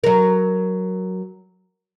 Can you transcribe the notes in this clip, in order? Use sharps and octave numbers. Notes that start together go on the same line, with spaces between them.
F#3 A#4